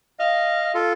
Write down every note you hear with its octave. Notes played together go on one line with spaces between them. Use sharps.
D#5 F5
F4 A4